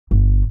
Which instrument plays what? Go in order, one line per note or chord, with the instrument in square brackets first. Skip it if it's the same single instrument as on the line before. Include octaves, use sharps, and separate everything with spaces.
[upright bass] G1